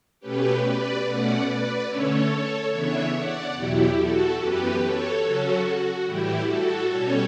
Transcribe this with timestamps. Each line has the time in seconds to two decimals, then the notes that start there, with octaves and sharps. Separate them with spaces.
0.20 B2 A3 C#4 G4 B4
0.62 B4 D5
1.04 B2 A3 C#4 D5 F#5
1.46 B4 D5
1.87 D3 A3 C#4 A4 C#5
2.71 C#3 E3 B3 D4 C#5 E5
3.12 D5 F#5
3.54 E2 B2 F#3 E4 G4
3.96 F#4 A4
4.37 F#2 E3 B3 G4 B4
4.79 A4 C#5
5.21 C#3 F#3 C#4 F#4 A4
5.63 F#4
6.04 A2 E3 G3 E4 G4
6.46 F#4 A4
6.87 B2 G3 C#4 A4 C#5